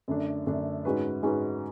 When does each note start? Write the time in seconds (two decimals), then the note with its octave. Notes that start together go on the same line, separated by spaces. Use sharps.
0.08 F#2 D3 A3 D4
0.46 F#2 D3 A3 D4
0.85 G#2 G#3 C#4 F#4 B4
1.23 G#2 G#3 C#4 F#4 B4